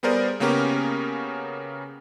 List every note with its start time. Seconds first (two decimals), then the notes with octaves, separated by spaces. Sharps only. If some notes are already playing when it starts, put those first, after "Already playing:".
0.03 G3 B3 G#4 A#4 C5 D5
0.40 C#3 A#3 B3 C#4 G4 A#4